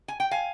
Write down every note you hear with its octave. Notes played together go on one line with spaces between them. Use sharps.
G#5
G5
F5 G#5